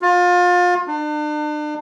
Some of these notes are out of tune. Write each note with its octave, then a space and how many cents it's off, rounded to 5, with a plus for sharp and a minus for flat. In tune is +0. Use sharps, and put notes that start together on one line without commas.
F4 +30
D4 +40